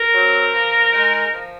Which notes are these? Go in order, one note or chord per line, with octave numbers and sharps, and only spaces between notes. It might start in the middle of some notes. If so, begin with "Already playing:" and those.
Already playing: A#4
F#3 C4
F3
G#3 D#4
F3